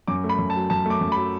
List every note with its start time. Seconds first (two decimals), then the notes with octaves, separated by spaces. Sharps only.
0.08 F#2 D6
0.24 A3
0.29 B5
0.39 F#2
0.50 A5
0.55 F#3
0.70 F#2 A5
0.86 A3 D6
1.01 F#2
1.12 B5
1.16 F#3